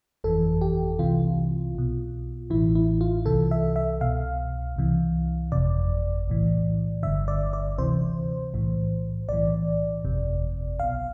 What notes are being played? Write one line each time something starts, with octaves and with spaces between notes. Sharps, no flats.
G1 F2 E3 A4
G4
C2 C3 E3 F4
B1 B2
A1 A2 E3 E4
E4
F4
C2 C3 E3 A4
E5
E5
C2 B2 F5
C2 C3 E3
G1 F2 C3 D5
B1 A2 E3
G1 G2 D3 E5
D5
D5
D2 C3 E3 C5
B1 A2 E3
B1 A2 E3 D5
G1 F2 C3
B1 B2 F5